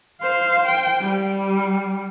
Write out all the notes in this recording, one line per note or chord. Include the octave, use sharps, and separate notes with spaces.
C5 F5
G5
G3